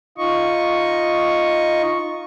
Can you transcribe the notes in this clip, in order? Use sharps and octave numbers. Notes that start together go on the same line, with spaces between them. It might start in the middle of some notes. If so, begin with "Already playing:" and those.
D#4 F4 D#5 C#6